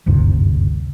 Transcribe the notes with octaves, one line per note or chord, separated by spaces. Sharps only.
F#1 D2 G2 C3